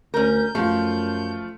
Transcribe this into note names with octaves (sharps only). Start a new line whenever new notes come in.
D2 C#4 A#4 G6
F#2 F3 A3 F4